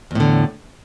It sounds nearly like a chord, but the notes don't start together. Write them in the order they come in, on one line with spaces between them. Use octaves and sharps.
E2 A2 D3